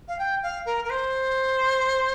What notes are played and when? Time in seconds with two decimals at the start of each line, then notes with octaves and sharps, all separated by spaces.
0.08 F5
0.18 G5
0.42 F5
0.65 A#4
0.84 A#4
0.90 C5